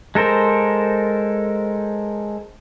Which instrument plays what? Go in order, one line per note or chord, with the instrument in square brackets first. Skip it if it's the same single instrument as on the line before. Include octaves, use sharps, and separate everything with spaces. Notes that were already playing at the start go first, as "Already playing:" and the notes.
[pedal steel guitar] G#3 A4 A#4 C5